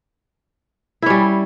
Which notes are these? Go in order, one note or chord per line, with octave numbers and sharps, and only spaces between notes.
G3 C#4 E4